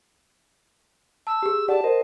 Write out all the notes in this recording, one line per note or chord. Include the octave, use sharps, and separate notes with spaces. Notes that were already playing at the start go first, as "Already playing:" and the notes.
A5 E6
G4 G#4
G4 D5 F#5 A5
A#4 C5 D#5